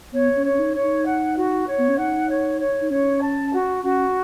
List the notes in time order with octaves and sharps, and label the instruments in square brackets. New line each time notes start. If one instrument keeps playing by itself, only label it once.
[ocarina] B3 [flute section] C#5
[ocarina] C#4
[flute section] C#5
[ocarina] C#4
D#4
[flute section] C#5
[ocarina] D#4
[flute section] F#5
F#4
C#5
[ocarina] B3
C#4
[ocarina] D#4 [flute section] F#5
[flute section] C#5
C#5
[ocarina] D#4
[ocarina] C#4 [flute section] C#5
[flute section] A5
F#4
[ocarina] C#4 [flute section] F#4